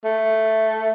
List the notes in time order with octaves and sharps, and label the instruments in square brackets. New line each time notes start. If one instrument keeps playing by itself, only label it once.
[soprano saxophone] A3